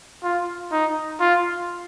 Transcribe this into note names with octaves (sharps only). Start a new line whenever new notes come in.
F4
D#4
F4